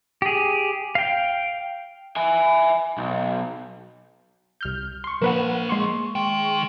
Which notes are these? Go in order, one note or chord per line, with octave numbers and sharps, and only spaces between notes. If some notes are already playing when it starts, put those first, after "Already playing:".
G4 G#4
F5 G5
E5 G#5
B1
C2 F6 G6
C6 C#6
F3 A#3 A#4 B4 F#5
G#3 C6 C#6
D#3 G5